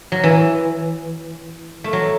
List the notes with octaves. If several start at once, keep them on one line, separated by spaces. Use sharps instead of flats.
F#3
E3
A3
F#3